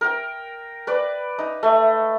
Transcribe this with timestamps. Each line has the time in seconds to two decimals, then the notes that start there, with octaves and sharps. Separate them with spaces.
0.01 A#4 G5
0.87 B4 D5
1.39 D#4
1.63 A3